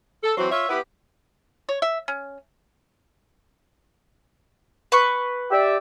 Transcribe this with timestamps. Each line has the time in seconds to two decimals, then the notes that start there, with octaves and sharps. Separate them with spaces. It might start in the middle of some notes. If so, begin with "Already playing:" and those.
0.23 A4
0.36 E3 F#3 C4 F#4 C5
0.51 F4 C#5 E5
0.68 B3 E4 G4 B4
1.69 C#5
1.82 E5
2.08 C#4
4.92 B4 C#6
5.51 G4 D5 E5